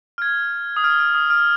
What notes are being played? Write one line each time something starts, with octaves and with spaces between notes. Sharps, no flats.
F6
G#6
D#6
F6
F6
D#6
F6